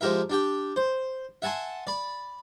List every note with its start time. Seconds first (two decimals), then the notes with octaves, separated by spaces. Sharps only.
0.01 F3 G#3 G4 A#4 E5
0.30 D4 G4 G5
0.76 C5
1.42 E5 F#5 G#5 A5 C6
1.87 D5 B5